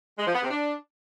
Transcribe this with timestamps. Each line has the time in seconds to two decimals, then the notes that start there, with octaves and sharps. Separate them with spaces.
0.19 G#3
0.27 F3
0.35 B3
0.43 C3
0.51 D4